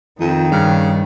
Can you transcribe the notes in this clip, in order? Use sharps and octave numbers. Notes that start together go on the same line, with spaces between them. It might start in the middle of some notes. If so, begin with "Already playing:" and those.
F2 D#3
G2 C#3